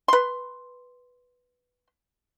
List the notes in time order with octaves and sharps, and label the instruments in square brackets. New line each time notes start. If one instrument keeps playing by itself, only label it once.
[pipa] B4 C6